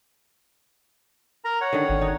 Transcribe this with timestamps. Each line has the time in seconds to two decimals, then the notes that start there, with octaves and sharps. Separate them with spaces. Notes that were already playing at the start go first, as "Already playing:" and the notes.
1.45 A#4 A#5
1.61 C#5 F#5
1.73 D3 D#3
1.89 G#1
2.01 D#4